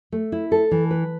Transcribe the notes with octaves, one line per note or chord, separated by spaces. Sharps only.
A3
E4
A4
E3
B4